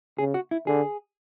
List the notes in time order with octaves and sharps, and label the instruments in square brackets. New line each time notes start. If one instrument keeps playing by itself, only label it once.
[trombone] C#3 [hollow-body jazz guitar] G#4
[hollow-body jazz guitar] F#4
E4
[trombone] D3 [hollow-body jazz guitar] G#4